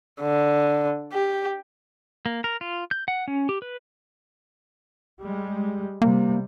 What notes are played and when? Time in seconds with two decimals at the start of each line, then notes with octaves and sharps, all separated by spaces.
0.21 D3
1.13 G4
2.26 A#3
2.44 A#4
2.61 F4
2.91 G6
3.08 F#5
3.28 C#4
3.49 G4
3.62 B4
5.20 G3 G#3
6.02 C3 G3 A#3